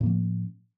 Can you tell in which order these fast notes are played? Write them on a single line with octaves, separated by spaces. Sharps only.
A2 A#3 F3 C#4